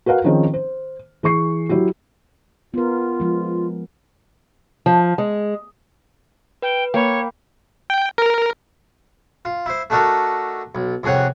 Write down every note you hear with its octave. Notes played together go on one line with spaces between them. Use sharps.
F#4 A#4 B4 F5 F#5
D#3 F3 C4 C#4 D#4 G#4
C5
E3 G#4 C#6 C7
F#3 E4 F#4 G4
B3 F4 A#4
F3 G#3
F3
G#3
B4 G5
A#3 C#5 G5 B5
G5
A#4
F4
E4 C5
A3 D4 D#4 F#4 A4 A#4
B1
C2 F2 G#4 C#5 F#5 G5